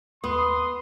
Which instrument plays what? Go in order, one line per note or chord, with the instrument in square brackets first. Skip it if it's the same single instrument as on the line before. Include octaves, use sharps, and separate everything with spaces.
[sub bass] D#2 [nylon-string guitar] B3 [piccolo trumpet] C6 [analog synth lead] D#6